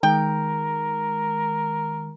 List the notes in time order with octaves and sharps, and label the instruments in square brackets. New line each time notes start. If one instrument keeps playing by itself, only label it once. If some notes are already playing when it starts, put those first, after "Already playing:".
[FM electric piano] D#3 G#3 [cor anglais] A#4 [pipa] G5